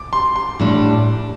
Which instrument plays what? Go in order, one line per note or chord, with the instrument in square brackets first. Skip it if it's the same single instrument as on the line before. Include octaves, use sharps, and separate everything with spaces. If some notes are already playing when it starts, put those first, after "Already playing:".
Already playing: [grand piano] D6
C6
C6
[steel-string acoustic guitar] A2 G3 D4